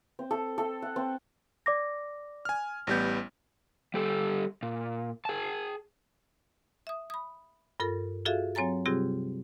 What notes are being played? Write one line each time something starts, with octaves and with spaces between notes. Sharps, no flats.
C4
A4
A4
F#5
C4
D5 D6 A#6
G#5 F6
A1 G3 B3 G6 A#6
G3 G4 A4
A#2
G#4 A5
E5 D#6
B5 D#6
G2 F4 A4 A#4
F4 F#4 G#4 A4 E5 F5
F#3 C4 C#5 G#5 A#5 A6
C3 G3 C4 F4 G4 G#4